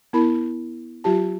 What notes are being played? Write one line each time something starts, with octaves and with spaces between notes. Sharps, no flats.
B3 E4 A#4 B5
F#3 F4 G4 A5